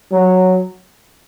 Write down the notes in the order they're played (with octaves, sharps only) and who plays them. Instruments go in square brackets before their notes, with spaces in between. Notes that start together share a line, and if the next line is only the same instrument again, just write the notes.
[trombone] F#3